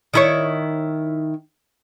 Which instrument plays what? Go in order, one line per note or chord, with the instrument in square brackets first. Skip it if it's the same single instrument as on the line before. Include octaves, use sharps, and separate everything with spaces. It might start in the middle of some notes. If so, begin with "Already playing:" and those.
[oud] D#3 E4 C#5